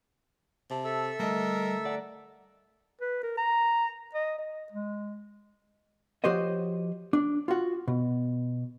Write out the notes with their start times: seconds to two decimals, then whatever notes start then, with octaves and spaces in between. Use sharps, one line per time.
0.70 C3 A5
0.84 A4 E5 E6
1.20 D3 G3 A3 A#4 D#5
1.85 D5 F#5 A#5
3.01 B4
3.23 A#4
3.37 A#5
4.14 D#5
4.39 D#5
4.72 G#3
6.24 F3 F#4 G4 C5 C#5 D#5
7.13 D4
7.48 F4 F#4
7.88 B2